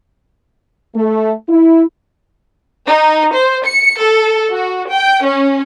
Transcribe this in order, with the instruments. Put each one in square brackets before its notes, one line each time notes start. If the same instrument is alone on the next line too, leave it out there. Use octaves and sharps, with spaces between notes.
[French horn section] A3
E4
[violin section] D#4
C5
C#7
A4
F#4
G5
C#4